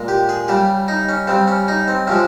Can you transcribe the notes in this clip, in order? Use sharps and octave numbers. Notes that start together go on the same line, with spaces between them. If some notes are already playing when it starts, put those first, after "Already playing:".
Already playing: A#2 G#3
G4
G#4
C#3 G3 G4
D#4
C#4
C#3 G3 C4
C#4
D#4
C4
C3 F3 G#3 C#4